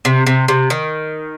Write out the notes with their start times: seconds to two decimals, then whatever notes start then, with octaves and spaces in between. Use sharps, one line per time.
0.05 C3
0.27 C3
0.48 C3
0.70 D#3